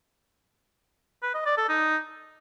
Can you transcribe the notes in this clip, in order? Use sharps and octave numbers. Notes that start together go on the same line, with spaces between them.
B4
D#5
D5
A4
D#4